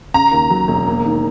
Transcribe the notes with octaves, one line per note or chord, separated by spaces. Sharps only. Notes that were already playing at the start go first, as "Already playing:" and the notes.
C#3 A#5
D#2
F#3
E1
A#3
D#3